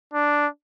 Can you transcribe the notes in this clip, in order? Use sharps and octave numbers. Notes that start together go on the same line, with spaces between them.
D4